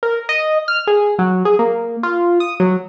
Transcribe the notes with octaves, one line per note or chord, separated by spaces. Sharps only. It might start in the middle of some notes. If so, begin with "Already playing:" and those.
A#4
D#5
F6
G#4
F#3
G#4
A#3
F4
D#6
F#3